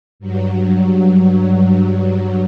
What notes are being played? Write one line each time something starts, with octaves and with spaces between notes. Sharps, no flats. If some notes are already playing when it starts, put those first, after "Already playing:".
G2 F#3